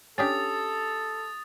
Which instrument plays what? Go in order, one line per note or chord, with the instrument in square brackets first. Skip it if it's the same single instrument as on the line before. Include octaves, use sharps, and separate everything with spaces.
[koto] C#4 D4 G4 [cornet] A4 [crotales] D#6 A6